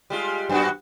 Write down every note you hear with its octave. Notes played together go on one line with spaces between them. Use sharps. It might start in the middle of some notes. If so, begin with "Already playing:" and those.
G3 G#3 F4
F#2 B3 F#4